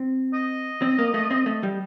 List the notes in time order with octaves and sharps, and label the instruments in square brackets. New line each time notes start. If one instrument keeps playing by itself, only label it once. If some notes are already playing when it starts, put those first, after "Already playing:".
Already playing: [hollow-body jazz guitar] C4
[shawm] D#5
[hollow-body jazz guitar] C4
A#3
A3
C4
A3
G3